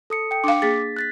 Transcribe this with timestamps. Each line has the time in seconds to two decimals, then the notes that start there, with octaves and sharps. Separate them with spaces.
0.10 A4 D#6 C#7
0.31 G5 C#7
0.44 D4 F5 D6
0.62 A#3 G#4 A6 B6
0.97 F#6 A6 B6